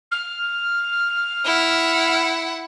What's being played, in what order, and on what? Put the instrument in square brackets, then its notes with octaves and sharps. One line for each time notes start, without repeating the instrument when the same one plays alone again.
[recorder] F6
[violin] E4 F#5